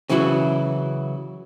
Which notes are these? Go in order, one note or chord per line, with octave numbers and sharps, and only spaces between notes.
C#3 E3 F#3 E4 F#4